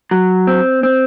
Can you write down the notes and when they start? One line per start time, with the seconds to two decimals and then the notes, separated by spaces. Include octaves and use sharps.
0.11 F#3
0.47 C4
0.83 C4